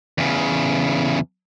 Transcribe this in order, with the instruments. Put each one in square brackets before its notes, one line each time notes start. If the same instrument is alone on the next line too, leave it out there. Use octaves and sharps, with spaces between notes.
[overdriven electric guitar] E2 C#3